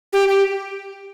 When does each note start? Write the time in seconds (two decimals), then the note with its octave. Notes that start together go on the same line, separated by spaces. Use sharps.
0.13 G4
0.29 G4